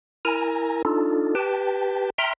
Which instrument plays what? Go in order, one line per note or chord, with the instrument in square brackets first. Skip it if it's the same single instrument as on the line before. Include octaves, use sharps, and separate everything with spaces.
[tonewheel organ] E4 A#4 G#5 A#5
D4 D#4 F4 A4
G4 B4 G5 A5
E5 G5 A#5 C6 F6